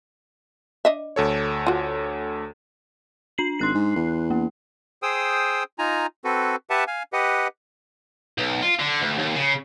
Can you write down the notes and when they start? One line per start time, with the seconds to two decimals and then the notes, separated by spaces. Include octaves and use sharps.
0.85 D4 D#5 E5
1.16 D2 A4 C#5
1.67 F4 F#4
3.38 D4 C7 F#7
3.59 G#1 C6 F#6 C7
3.74 G#2
3.96 E2
4.31 A#3
5.03 G#4 C5 G5 D#6 E6
5.79 D#4 F4 G#5 A#5
6.24 C4 F#4 A4 B4
6.70 G4 B4 E5 F#5 A5
6.87 F5 G#5
7.13 G4 B4 D#5 F#5
8.38 B1
8.62 F4
8.79 D3
9.01 D2
9.18 D#2
9.35 C#3